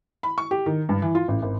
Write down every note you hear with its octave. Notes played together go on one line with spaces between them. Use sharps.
B5
C#6
G4
D#3
G2
E3
F4
A1
G#1